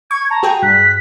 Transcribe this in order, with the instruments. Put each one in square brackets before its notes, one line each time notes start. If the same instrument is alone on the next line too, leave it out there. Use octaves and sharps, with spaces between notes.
[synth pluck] C#6 [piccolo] G#6
[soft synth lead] A5 [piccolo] A#5
[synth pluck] F#4 G#4 G5
[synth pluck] G2 [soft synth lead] F#6 [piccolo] B6